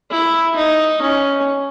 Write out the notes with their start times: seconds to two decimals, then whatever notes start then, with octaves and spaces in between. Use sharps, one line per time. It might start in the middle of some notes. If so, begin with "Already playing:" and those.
0.10 E4
0.56 D#4
1.01 C#4